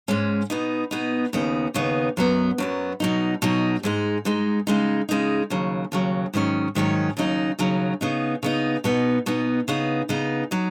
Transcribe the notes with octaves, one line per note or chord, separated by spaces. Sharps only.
G#2 G#3 C#4
B2 B3 D#4
B2 B3 D#4
D#2 C#3 B3 D#4
D#2 C#3 B3 D#4
F#2 F#3 B3
F#2 F#3 B3
B2 F#3 D#4
B2 F#3 D#4
G#2 G#3 D#4
G#2 G#3 D#4
C#3 G#3 D#4
C#3 G#3 D#4
D#2 C#3 F#3
D#2 C#3 F#3
G#2 D#3 F#3 C#4
G#2 D#3 F#3 C#4
D#2 C#3 F#3 D#4
D#2 C#3 F#3 D#4
C#3 B3 D#4
C#3 B3 D#4
B2 B3 D#4
B2 B3 D#4
C#3 B3 D#4
C#3 B3 D#4
F#3 D#4